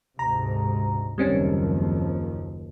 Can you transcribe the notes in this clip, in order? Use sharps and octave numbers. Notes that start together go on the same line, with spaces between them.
D2 G#2 C3 A#5
F#1 D#2 F3 G3 C4 C#4